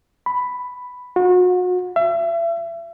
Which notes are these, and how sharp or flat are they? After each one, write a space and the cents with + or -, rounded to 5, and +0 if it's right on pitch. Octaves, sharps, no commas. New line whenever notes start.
B5 +5
F#4 -35
E5 +35